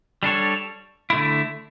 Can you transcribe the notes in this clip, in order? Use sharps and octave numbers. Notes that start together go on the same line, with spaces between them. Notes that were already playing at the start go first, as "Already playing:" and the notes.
G3 D4 A4 C#5
D3 A3 E4